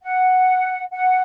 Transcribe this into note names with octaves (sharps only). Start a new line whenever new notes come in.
F#5
F#5